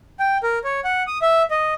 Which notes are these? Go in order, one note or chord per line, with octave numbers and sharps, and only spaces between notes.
G5
A#4
C#5
F#5
D#6
E5
D#5